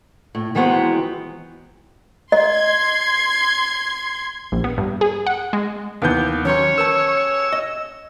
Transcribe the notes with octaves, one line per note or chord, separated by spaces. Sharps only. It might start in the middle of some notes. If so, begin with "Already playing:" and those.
A2
D#3 E3 F#3 G#3 B3 C4
D#5 C6 G#6
A#1
B3
G2
G#4
F#5
G#3
D#2 C3 E3 B3 G6
D#3 F#3 C#4 C#5 C6
A#4 B4 A5 E6
D#5